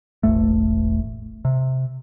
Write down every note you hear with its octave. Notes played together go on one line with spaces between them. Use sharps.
E1 A1 A3
C3